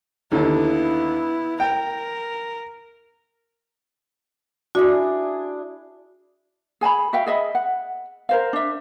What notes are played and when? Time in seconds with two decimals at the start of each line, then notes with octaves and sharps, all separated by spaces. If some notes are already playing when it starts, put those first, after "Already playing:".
0.32 D#2 D3 B3 E4
1.60 A#4 G5
4.75 D4 E4 F#4 G#4
6.81 G#4 G#5 A5 B5
7.13 F#4 E5 F5 G5
7.27 G#4 D#5 E5 B5
7.55 F#5
8.29 A#4 C5 F5
8.53 D4 E5